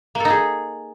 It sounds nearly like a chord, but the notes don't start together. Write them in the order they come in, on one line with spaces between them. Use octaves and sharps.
A#3 A4 D#4 G#4